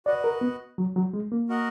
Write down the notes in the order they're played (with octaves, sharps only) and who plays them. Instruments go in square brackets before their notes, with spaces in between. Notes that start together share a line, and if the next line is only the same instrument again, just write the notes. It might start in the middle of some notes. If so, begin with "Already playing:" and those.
[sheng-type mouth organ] F#4 B4 D#5 F#5 [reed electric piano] D5
[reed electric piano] A#4
B3
F#3
F#3
G#3
A#3
[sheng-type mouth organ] F#4 A#4 D#5 F#5